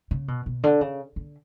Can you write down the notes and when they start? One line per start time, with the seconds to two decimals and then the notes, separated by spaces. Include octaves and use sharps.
0.11 C#3
0.28 B2
0.46 B2
0.63 D3
0.81 C#3
1.16 D3